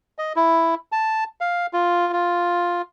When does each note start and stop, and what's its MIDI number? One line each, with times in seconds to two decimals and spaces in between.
0.18 0.33 75
0.36 0.75 64
0.92 1.24 81
1.41 1.66 77
1.73 2.13 65
2.13 2.82 65